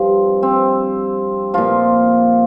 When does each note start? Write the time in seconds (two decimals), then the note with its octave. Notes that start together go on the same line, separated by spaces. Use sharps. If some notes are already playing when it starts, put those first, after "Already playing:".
Already playing: G2 F3 C4
0.43 C4
1.54 A#2 F3 F4